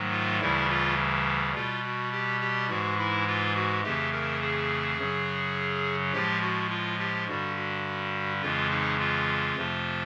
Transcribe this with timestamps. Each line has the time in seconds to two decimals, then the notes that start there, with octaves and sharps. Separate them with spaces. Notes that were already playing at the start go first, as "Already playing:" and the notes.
Already playing: G#2 D#3 F#3 A3
0.12 F4
0.40 D2 C#3 E3 G3 E4
0.69 F4
1.55 B2 G3 F4
1.84 F#4
2.12 G4
2.41 G4
2.69 G#2 E3 G#3 F#4
2.98 E4
3.27 F4
3.55 F#4
3.84 F2 C#3 E3 A3 G4
4.12 A#4
4.41 G#4
4.98 F#2 C#3 F#3
6.13 A2 F3 G#3 G4
6.41 F#4
6.70 F4
6.99 G4
7.27 G2 D3 G3 F#4
7.56 F#4
8.42 F2 C#3 E3 G#3 F4
8.71 D#4
8.99 F4
9.56 F2 C3 F3 A3